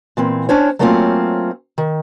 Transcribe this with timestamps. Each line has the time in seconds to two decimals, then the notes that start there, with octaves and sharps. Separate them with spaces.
0.17 A#2 E3 C4
0.49 C#4 D4 C5 C#5
0.79 F#3 A3 A#3 C4 C#4 F4
1.78 D#3